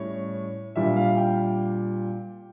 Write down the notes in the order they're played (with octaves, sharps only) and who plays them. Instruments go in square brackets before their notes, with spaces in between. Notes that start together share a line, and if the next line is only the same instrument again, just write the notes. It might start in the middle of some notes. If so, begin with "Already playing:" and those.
Already playing: [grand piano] A2 G3 C#4 E4 C#5
A#2 G3 D4 E5
F5
G5